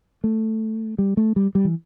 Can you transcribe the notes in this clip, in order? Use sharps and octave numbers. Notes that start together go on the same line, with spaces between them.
A3
G3
A3
G3
G3
E3